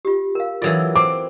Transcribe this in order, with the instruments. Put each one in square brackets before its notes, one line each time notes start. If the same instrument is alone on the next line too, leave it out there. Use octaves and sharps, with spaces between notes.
[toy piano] F4 G4
A#4 F5
[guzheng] E3 F#3 D5 [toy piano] F4 A4 A#4
[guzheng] C4 [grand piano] D6